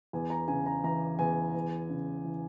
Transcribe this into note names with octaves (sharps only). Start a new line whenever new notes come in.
E2 G#5
A#5
C#3 G#5
A#5
E3 A#5
E2 G#5
E2
C#3
E3